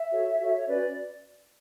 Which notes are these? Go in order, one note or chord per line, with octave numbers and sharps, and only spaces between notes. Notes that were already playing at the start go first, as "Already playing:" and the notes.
Already playing: E5
F#4 A4 C#5
F#4 A4 C#5
C#5
C#4 F#4 B4 D5